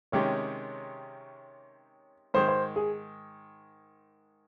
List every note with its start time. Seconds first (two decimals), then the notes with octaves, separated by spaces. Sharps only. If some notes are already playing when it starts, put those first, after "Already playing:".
0.12 C3 D#3 G#3 C#4 G4 C#5
2.34 G#2 D#3 G#3 C5
2.48 C5
2.76 G#4